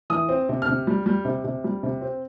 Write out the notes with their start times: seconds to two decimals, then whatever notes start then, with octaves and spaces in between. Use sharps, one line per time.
0.10 E3 D#6
0.29 C4
0.49 C3
0.62 F6
0.68 C3
0.87 G3
1.06 G3
1.25 C3
1.44 C3
1.64 G3
1.83 C3
2.01 C4